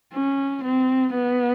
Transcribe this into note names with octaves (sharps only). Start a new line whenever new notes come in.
C#4
C4
B3